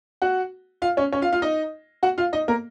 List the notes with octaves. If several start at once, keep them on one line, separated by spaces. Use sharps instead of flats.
F#4 F#5
F4 F5
C#4 C#5
C#4 C#5
F4 F5
F4 F5
D#4 D#5
F#4 F#5
F4 F5
D#4 D#5
A#3 A#4